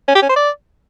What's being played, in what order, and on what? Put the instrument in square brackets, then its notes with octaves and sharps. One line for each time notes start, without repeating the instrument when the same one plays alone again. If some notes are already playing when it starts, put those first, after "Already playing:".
[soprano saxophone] C#4
G4
C#4
C5
D5